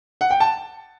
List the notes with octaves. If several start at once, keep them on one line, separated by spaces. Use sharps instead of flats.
F#5
G5
A5